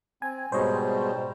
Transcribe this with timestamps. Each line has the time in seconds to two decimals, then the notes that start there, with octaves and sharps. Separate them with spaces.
0.22 C4 G#5
0.52 G#2 B2 G3 C5 C#5 D#5